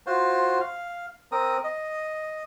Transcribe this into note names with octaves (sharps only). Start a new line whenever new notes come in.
F4 F#4 C5
F5
C4 A#4 D#6
D#5